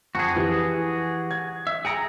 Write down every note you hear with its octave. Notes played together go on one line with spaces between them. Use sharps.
F2 F#4 G#4
E3 G4
G#6
E5
G#4 G5 A#5 C#7